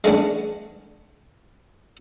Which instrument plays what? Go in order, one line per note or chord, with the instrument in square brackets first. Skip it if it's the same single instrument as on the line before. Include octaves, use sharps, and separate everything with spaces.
[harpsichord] G#3 A3 B3 C#4 D4